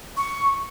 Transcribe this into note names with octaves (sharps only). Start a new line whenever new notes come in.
C#6